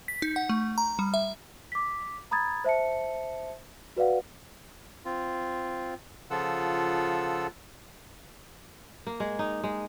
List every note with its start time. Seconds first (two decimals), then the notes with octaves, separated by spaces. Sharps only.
0.08 B6
0.22 D#4
0.36 F#5
0.49 A3
0.78 A#5
0.99 G3
1.14 E5
1.72 D6 B6
2.31 A#5 B5 D#6 G#6 A6
2.64 C5 E5 A5 C#7
3.97 F#4 B4 D5 F5 F#5
5.05 C4 F4
6.30 C#3 F3 F4 A4 F#5 E6
9.07 A#3
9.20 G#3
9.39 D#4
9.64 G#3